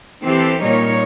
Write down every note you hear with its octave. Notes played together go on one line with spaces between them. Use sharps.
E3 C4 G4 A4
A#2 G3 D#4 A#4 C#5